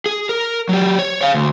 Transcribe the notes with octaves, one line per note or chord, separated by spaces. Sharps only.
G#4
A#4
F#3 G4
C#5
C#5 F5
D2